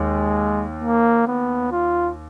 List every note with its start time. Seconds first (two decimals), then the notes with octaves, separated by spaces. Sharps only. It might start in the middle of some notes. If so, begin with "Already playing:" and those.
Already playing: D#2 G#3
0.84 A#3
1.27 B3
1.72 F4